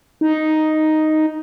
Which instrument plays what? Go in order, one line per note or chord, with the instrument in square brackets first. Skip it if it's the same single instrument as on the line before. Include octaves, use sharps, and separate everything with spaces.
[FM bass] D#4